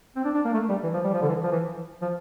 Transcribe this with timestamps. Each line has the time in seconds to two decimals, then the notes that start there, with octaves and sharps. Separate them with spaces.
0.16 C4
0.25 D4
0.35 D4
0.45 A#3
0.54 A3
0.69 G3
0.83 E3
0.94 F3
1.04 G3
1.14 F3
1.22 D3
1.29 E3
1.43 F3
1.52 E3
2.02 F3